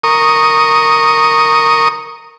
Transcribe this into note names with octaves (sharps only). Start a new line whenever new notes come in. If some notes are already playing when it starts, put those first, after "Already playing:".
A#4 C#6 D#6